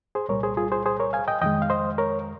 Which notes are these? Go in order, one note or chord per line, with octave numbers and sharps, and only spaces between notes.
G#4 C5
C2 A#2 G3 A#4 C#5
G#4 C5
F4 G#4
G#4 C5
G#4 C5
A#4 C#5
F5 G#5
D#5 G5
F2 D#3 G#3 D#5 G5
F5
C5 D#5
A#4 C#5